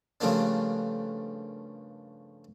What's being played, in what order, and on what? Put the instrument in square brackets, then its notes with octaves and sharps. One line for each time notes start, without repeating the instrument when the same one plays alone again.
[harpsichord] G2 C#3 F3 A3 A#3 D4